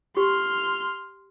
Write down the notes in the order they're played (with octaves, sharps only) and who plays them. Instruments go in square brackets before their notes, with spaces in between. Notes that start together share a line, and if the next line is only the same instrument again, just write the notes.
[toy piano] G4 [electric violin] C6 F6